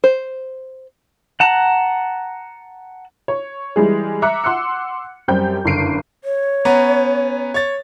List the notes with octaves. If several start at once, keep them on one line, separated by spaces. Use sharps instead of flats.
C5
F#5 A5 A#5
C#5
E3 G3 G#3 G#4
E5 A#5 D6 F#6 C#7
F#5 C6 D6 E6 F#6 C#7
F#2 G3 C4 G4 G5 G6
F#1 G2 D3 C7 D7 D#7
C#5
B3 C#4 A#5
C#5 A6